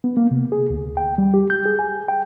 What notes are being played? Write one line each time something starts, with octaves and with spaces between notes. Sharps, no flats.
B3
A#3
C3
G#4
D2
G5
G3
G4
G6
G#4
G#5
G5